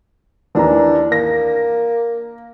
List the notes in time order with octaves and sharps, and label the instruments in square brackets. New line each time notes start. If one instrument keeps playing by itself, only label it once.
[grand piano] D#2 E3 A#5 [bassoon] D4
[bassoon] A#3 [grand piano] A#6